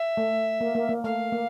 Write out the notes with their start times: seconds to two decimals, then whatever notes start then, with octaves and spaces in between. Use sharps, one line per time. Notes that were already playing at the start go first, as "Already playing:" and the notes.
Already playing: E5
0.17 A3
0.61 A#3
0.75 A#3
0.89 A#3
1.04 A3 F5
1.32 A#3